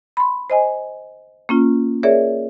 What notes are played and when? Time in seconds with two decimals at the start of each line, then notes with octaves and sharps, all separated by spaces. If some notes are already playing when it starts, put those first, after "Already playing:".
0.17 B5 C6
0.50 C5 D#5 G#5
1.49 A#3 C#4 F4
2.03 G#4 A#4 C#5 D5 E5